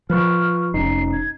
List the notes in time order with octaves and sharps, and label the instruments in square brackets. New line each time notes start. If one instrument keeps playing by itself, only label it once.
[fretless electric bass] F3 [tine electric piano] F4 B4 C#6 [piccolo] F6
[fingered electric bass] F1 [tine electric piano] C#4 D#4 [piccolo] C7
[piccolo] G#6